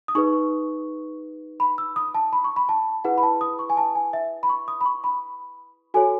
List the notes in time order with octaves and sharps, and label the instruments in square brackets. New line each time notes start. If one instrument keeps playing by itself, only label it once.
[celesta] D#6
D#4 G#4 B4 C#6
B5
E6
D#6
A5
B5
C#6
B5
A5
E4 G#4 B4 F#5
B5
A5
D#6
C#6
G#5
A5
G#5
E5
B5
C#6
D#6
B5
C#6
B5
F#4 A4 C#5 G#5